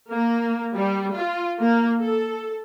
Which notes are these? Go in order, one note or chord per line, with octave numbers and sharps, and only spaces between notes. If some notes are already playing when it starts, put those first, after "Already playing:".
A#3
G3
F4
A#3
A4